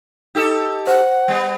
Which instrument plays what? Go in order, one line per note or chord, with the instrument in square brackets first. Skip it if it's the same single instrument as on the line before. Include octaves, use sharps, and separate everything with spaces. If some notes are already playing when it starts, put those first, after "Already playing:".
[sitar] D#4 G4 A4
[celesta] C5 [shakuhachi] F#5
[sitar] G3 B3